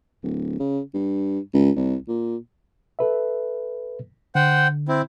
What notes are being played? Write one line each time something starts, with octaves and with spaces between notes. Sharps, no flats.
D1
C#3
G2
C#2
C2
A#2
A4 B4 E5
D3 C5 F#5 G5
C4 E4